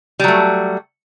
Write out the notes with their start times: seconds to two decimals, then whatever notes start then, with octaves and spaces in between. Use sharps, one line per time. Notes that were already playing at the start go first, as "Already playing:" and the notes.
0.20 G3
0.24 F#3
0.28 A3